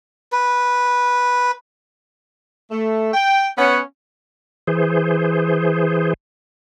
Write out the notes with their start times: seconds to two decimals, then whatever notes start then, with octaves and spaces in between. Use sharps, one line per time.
0.32 B4
2.71 A3
3.14 G5
3.58 B3 C#4 F#5
4.67 E3 G#4 C5